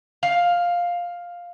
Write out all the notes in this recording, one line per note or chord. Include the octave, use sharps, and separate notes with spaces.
F5